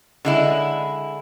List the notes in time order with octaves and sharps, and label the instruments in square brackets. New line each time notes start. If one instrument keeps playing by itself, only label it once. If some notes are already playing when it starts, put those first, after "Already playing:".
[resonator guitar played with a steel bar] D3 G#3 E4